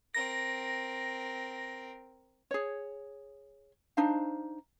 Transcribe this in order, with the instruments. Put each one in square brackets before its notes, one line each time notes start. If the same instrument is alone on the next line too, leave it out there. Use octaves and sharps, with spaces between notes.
[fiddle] C4 A#4 [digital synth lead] A#6
[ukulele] G#4 C#5
D4 D#4 C5 F5